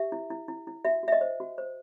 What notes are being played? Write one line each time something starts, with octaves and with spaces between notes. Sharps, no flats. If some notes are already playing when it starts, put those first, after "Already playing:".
Already playing: G4 E5
E4
E4
E4
E4
F#4 E5
F#4 E5
D#5
C5
F#4
C5